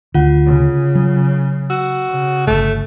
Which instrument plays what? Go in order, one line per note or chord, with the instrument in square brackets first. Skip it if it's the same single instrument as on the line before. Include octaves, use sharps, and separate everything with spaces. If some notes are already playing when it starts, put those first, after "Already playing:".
[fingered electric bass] D2 D3 [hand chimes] F4 F#5
[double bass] C#3
[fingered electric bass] F#3
[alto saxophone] F#4 [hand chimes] E6
[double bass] C#3
[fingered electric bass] D1 G1 [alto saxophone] A3